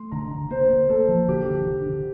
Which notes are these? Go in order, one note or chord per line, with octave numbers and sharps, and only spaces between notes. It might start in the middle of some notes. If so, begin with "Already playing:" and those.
Already playing: A3 C6
D3 A#5
D3
A#3 C5
A#3
A#3 A4
F3
D3 G4
D3
D3
D3